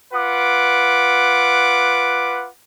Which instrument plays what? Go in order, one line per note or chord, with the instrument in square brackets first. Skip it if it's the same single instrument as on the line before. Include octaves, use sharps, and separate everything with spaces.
[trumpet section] F4 B4 F#5 D6